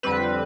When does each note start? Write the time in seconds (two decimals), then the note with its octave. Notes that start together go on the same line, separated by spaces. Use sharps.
0.03 F2 D3 G3 C4 B4